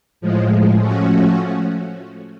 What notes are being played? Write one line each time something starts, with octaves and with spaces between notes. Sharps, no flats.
A2 F3 G#3
F3 A3 C#4 F#4